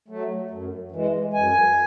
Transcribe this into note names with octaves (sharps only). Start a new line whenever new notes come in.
F#3 A3
F#2
E3 G#3
F#2 G#5